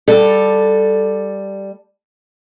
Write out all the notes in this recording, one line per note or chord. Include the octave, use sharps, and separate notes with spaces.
G3 A4